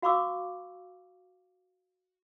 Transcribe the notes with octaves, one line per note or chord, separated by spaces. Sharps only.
F#4 F5 B5 C#6 D6 E6